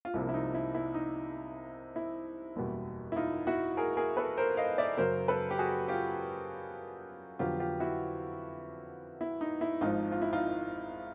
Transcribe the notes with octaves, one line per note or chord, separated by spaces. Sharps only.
F4
C2 C3 F3 A#3 E4
E4
D#4
E4
E4
D#4
E4
F#1 E2 B2 G3
E4
D#4 F4
E4 F#4
G#4 A#4
G#4 A#4
A4 B4
A#4 C5
D#5 F5
D5 E5
F#2 C#3 F#3 A#4 C5
A4 B4
G4
F#4 G#4
F4 G4
F2 D3 F#3 B3 F4 G4
F4 G4
E4 F#4
E4
D#4
E4
G#1 G#2 F3 D#4 F4
F4
E4
D#4 F4